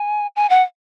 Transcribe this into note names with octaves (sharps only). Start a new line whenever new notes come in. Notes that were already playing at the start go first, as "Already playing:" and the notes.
Already playing: G#5
G#5
F#5